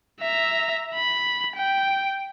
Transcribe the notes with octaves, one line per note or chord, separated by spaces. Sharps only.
E5 A#5
B5
G5